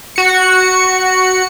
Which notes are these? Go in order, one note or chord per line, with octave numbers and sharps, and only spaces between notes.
F#4 C#7